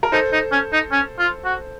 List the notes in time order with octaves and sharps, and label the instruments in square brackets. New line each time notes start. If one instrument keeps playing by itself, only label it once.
[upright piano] A#4
[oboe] D#4 [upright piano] A4 C5
[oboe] D#4
C#4
D#4
C#4
F4
F#4